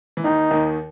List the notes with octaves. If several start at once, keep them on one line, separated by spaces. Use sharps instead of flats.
E3
D#2 D#3 D#4
D#2 D#3